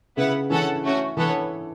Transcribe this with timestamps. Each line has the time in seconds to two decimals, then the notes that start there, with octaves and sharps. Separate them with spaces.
0.17 C#3 B3 E4 B4 F#5
0.50 E3 C#4 A4 F#5 A5
0.84 A3 C#4 F#4
1.17 E3 B3 A4 C#5 F#5